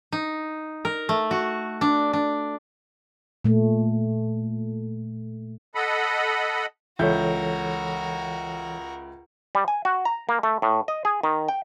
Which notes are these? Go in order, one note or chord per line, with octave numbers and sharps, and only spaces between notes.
D#4
A#4
A3
F#4
D4
D4
A#2 A3
A4 D#5 F#5 B5
C#2 E3 F#4 A4 A#4 C#5 E5 G6
G3
G#5
F#4
A#5
A#3
A3
A2
D#5
G#4
D#3
G5